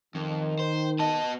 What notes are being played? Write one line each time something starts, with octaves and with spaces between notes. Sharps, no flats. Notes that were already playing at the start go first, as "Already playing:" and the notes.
F2 D#3
C5
B3 D#5 A5